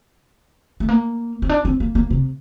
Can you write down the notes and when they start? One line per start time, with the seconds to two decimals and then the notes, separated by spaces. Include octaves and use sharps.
0.80 A3
0.89 A#3
1.42 C4
1.49 D4
1.65 C4
1.80 A#3
1.95 A#3
2.10 C3